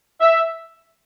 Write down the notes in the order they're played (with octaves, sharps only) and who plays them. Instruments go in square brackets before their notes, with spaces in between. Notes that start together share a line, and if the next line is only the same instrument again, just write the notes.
[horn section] E5